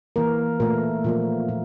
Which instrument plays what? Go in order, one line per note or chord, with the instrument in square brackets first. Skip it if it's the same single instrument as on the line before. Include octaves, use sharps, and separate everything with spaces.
[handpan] E3 A#3 A#4
A#2 A3 A#4
A#2 F3 A#3
A#2